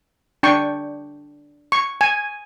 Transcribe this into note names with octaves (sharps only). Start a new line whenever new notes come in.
D4 G5 C#6
C#6
G#5